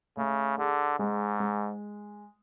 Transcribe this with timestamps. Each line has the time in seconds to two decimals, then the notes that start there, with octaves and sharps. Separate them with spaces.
0.17 C#3 A3
0.58 D3 G#4
0.99 G#2 G#3
1.40 G#3